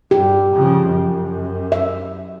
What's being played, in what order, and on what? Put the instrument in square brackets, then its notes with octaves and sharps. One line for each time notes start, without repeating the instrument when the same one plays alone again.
[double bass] G2 [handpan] G4
[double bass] C#3 F3
F#2
[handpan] E5